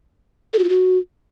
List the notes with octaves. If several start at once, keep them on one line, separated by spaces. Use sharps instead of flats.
A4
F#4
F4
F#4